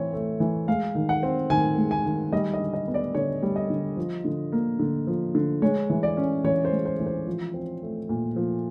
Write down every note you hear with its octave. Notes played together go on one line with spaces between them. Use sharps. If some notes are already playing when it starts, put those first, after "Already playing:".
Already playing: E3 C4 C#5
A3
E3
G#3 F5
D#3
F#5
C4
D#3 G#5
G#3
G#5
D#3
G3 D#5
D#5
D3
D#5
B3
D5
D3 C#5
G3
D#5
D3
F3
D3
A#3
D3
F3
D3
G#3 C#5
E3
D5
C#4
E3 C#5
C5
G#3
C5
E3
C5
F3
C4
A3
A#2
F3